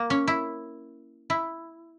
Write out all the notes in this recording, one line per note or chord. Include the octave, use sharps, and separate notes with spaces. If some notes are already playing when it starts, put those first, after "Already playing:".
Already playing: A#3
C#4
E4
E4